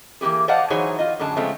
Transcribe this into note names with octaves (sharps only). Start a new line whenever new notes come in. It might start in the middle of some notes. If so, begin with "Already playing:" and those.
E3 A#3 B3 G4 G#4
C5 D5 D#5 F5 F#5 A5
E3 F#3 D#4 G#4 C5 C#5
F4 D#5
F#2 A2 D3 G#4 A5
C#3 F3 G#3 A3 C4 C#4